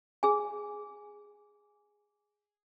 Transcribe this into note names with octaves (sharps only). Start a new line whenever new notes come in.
G#4 G#5